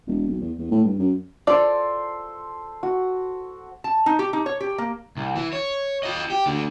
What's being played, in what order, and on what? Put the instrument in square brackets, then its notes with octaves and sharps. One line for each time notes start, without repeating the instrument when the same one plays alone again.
[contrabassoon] E1
B1
E2
E2
A2
G2
F#2
[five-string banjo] F4 D5 [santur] A4 C5
[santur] F#4
[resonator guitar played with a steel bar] A5
D#4
G4
D#4
C#5
G4
A#3
[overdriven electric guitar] C2
E3
C#5
F4 D#5
G4
D2 D3